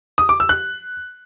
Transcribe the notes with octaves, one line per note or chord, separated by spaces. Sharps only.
D#6
D6
E6
F#6